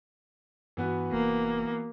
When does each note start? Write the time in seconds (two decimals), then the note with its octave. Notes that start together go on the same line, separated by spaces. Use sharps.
0.77 G2 E3 B3 F#4
1.12 F1 A#3